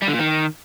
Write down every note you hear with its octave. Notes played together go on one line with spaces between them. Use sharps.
G3
D3
A#2
D#3